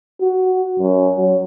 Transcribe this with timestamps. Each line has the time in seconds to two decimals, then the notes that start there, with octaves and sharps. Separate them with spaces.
0.21 F#4
0.79 F#2
1.16 F#3